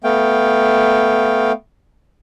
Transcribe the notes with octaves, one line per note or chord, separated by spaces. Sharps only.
A3 B3 F5 G5